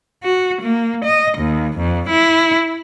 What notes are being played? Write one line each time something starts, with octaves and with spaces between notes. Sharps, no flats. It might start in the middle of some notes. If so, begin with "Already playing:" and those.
F#4
A#3
D#5
D#2
F2
E4